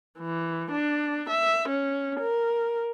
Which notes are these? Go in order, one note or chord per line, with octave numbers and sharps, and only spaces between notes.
E3
D4
E5
C#4
A#4